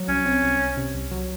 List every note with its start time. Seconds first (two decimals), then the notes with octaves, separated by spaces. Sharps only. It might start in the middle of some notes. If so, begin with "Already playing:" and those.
Already playing: F#3
0.08 C2 C#4
0.26 C4
0.43 C2
0.60 C2
0.77 C3
0.95 C2
1.11 F#3